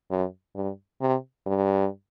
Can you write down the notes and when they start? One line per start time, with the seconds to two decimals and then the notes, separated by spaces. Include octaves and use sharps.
0.10 F#2
0.55 G2
1.01 C3
1.46 G2